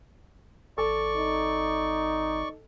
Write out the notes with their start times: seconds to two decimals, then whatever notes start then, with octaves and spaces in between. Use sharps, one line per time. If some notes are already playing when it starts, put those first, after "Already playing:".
0.78 G#1 A4 D5 C#6
1.16 D#4